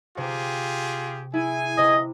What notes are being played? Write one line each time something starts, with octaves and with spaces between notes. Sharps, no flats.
C3 F4 G4 G#4
E4 G#4 G#5
C3 D#5